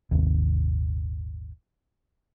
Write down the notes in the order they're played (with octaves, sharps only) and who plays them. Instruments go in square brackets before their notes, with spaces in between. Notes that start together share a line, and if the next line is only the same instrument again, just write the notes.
[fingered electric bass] D#1 G#1 D#2 C3